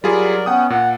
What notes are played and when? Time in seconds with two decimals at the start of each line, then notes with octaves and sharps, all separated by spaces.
0.04 F#3 G3 F4 G#4 A#4 D5
0.46 B3 C#4 F#5 G5 D#6
0.70 A#2 F#5